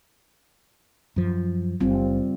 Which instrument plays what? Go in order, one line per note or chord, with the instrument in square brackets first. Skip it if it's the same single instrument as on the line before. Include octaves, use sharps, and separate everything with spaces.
[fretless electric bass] F#2 F3
[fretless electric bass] F#1 [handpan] G3 C4 F4